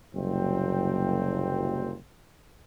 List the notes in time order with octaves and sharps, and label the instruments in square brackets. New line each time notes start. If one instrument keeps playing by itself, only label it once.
[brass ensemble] F#1 C2 A#2 F#3 C4 G5